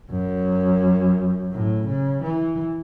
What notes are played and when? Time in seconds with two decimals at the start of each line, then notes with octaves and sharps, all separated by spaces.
0.11 F#2
1.52 A2
1.87 C#3
2.22 E3